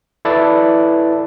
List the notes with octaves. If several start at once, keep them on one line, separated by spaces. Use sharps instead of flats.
E4 A4 B4 D5